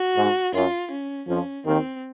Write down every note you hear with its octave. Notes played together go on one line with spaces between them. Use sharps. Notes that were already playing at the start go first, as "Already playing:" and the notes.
Already playing: F#4
G#2
F#2 F4
C#4
F2 F3 C#4
D#2 D#3 C4